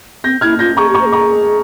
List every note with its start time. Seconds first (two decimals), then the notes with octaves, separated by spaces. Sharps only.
0.24 C4 G6 A#6
0.41 E4 F6 G#6
0.59 F4 G6 A#6
0.77 G#4 A#5 C#6
0.89 G4
0.95 A#5 C#6
1.01 C5
1.06 G#4
1.12 A#5 C#6